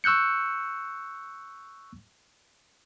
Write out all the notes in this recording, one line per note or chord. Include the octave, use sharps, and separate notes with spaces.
C#6 E6 F#6 G6 C#7